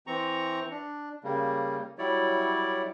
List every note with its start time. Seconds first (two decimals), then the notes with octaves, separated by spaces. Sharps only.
0.07 E3 C4 A#5 C#6
0.71 D4
1.24 C#3 G3 A#3
1.98 F#3 G3 E4 C#5 D5